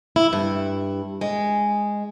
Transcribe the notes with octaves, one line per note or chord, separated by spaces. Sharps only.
E4
G2
G#3